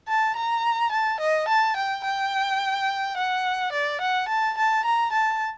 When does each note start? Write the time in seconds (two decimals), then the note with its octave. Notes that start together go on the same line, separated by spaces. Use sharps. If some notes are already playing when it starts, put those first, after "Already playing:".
0.08 A5
0.36 A#5
0.92 A5
1.20 D#5
1.48 A5
1.77 G5
2.05 G5
3.17 F#5
3.72 D5
4.01 F#5
4.29 A5
4.57 A5
4.85 A#5
5.13 A5